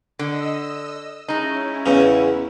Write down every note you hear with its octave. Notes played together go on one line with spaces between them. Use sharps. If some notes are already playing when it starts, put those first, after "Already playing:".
D3 D#5 E6
G#3 C#4 D#4 E4
E2 C#3